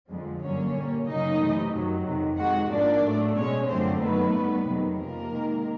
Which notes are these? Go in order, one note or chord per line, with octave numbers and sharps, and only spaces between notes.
F2 D3 F3 G#3
G2 D3 F#3 A#3 C#4 C#5
A#2 G3 A#3
F#2 C#3 F#3 A#3 D#4 D#5
C3 E3 A3
F#2 D#3 F#3
F2 C3 D#3
C3 D#3 G#3 F#4 F#5
G#2 F3 A#3 D4 D5
A2 F#3 A3
B2 G#3 C#4 C#5
F#2 D3 F3 A3 C4 C5
F#2 D#3 F#3 A3 B3 B4
G2 D#3 G3
F2 C3 D#3 F#3
C3 F3 G#3 A#3 A#4
C3 D#3 G#3